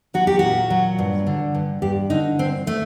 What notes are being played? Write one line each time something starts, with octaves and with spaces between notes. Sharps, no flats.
F#3 F#4
G4
A#2 F#4
F#3
G2
D3
G2
G2 G4
D3 D#4
G2 C4
A3